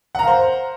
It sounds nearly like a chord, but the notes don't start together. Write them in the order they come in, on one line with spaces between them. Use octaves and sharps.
F#5 A#5 F5 C5